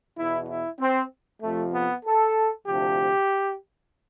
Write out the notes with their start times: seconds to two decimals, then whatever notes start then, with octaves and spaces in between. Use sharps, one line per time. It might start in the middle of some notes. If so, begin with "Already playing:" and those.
0.17 E2 B2 E4
0.49 E4
0.80 C4
1.42 F2 C3 F3 A3
1.74 B3
2.06 A4
2.68 D2 C3 F3 G4